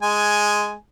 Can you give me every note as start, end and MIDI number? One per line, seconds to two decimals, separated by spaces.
0.02 0.74 56
0.02 0.74 80